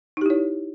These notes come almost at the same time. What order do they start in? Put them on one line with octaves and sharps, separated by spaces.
D#4 G4 E4 C#5